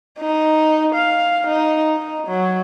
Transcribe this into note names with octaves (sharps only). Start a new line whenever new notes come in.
D#4
F5
D#4
D#4
F#3